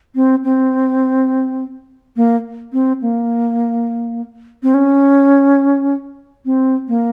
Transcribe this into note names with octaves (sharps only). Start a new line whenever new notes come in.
C4
C4
A#3
C4
A#3
C4
C#4
C4
A#3